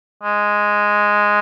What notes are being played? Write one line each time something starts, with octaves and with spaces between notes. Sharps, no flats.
G#3